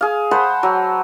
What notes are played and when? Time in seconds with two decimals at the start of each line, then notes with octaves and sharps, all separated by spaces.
0.01 G#4 F5
0.31 C5 F#5 A5 B5
0.63 F#3